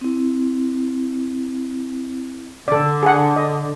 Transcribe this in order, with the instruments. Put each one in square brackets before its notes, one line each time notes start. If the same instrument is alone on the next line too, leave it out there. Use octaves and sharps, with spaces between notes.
[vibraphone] C4 E4
[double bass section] D3 [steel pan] A4 D5
[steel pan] G#4 F#5
D#5